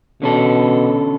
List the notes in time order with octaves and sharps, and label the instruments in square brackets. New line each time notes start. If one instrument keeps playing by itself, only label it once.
[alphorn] B2 [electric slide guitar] D3 C#4 A4